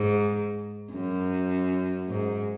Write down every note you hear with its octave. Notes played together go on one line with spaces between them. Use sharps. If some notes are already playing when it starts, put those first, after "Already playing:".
Already playing: G#2
F#2
G#2